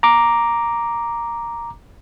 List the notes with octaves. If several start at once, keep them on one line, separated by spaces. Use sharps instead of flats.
A#5 D6